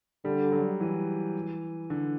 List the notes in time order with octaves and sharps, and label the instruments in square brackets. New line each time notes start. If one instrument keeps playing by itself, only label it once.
[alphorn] D3 [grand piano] G3
[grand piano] F#3
E3
D3